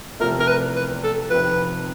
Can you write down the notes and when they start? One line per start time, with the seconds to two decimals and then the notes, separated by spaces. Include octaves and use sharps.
0.20 E2 C3 F3 A3 A#4
0.40 A#4
0.48 B4
0.76 B4
1.03 A4
1.30 F2 C3 D#3 B4